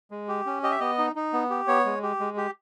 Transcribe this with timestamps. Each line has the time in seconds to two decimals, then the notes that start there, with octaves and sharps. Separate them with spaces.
0.11 G#3
0.28 G4
0.46 C#4
0.63 G4 D#5
0.71 E5
0.80 B3 D#5
0.98 D#4
1.16 D#4
1.33 B3
1.50 G4
1.67 B3 C#5
1.85 G#3
2.03 G4
2.20 G#3
2.37 G4